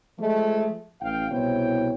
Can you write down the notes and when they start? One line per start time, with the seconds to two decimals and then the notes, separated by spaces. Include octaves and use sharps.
0.19 F3 G#3 A3
1.01 A1 F5 G5
1.31 C2 B2 E4 C5 C#5 G5